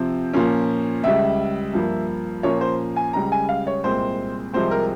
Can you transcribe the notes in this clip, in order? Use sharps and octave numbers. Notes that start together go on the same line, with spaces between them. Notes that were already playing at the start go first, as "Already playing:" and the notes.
Already playing: C3 F3 C4
A#2 F3 A#3 C#4
C#2 C#3 G3 E5
G2 F3 A#3
A#2 F3 A#3 C#4 C#5
C5
G#5
C#2 C#3 G3 A#5
G#5
F5
C#5
C2 A#2 G#3 C4 C5
C2 C3 F3 G#3 C4 C5
A#4